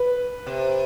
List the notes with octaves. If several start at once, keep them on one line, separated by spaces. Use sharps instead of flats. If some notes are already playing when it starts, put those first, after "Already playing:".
Already playing: B4
C3